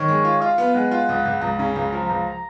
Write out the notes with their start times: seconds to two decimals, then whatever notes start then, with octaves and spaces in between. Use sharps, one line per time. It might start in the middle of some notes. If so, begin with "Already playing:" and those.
Already playing: D#3 C#5
0.08 G#3
0.25 F4
0.41 F4 F5
0.58 B3
0.74 G#3 F#5
0.91 F4
1.09 C#2
1.25 C#2
1.41 C#2 A#5
1.59 C#3
1.76 C#2
1.92 F3
2.09 C#2 A#5